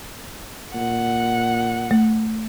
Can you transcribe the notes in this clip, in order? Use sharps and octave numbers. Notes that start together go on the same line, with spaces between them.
A#2 F#5
A3